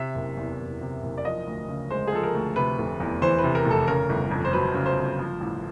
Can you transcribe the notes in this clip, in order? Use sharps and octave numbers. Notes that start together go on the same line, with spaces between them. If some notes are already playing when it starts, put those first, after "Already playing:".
Already playing: C3 E5
F#1
E2
F#1
C3
F#1
D5
F3 D#5
D2
C#3
G#3 C5
G#4
F3 A4
A#4
D2
C3 B4
F1
E2
E3 C5
B4
C3
A#4
F1
A4
C#3 A#4
G1
F2
C5
F#3 B4
C#3
C5
G1
F3
A1